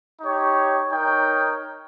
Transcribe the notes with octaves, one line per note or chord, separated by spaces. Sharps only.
D#4 G4 C#5
D#4 A#4 C#5 G5